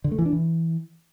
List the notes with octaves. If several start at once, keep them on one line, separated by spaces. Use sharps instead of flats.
D3
A3
E3
D4
E3